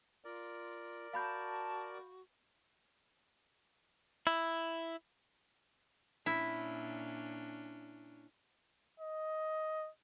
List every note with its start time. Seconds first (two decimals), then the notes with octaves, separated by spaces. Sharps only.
0.25 F4 A#4 D5
1.13 F#4 F5 A5 B5 G6
4.27 E4
6.26 A#2 C#4 D4 E4
9.00 D#5